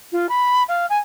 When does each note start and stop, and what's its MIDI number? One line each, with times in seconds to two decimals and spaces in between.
0.12 0.27 65
0.29 0.63 83
0.69 0.86 77
0.90 0.98 80